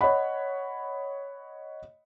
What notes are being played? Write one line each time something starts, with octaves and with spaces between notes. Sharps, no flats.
C#5 D#5 F#5 B5